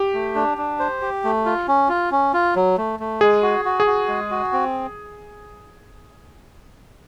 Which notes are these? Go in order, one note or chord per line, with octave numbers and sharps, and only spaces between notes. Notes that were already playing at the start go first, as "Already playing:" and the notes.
Already playing: G4
A3
D4
D4
C5
G4
A3
F4
C#4
F4
C#4
F4
F#3
A3
A3
G#3 G#4
F#4
F#4
G#4
F#4
G#3
F#4
C4